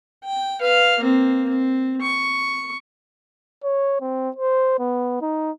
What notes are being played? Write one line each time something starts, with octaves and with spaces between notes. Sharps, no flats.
G5
B4 F5
A#3 C4
C4
C#6
C#5
C4
C5
B3
D#4